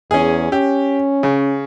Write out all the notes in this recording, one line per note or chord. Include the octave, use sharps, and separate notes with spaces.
E2 C#4 G#4
C#4 G4
C#3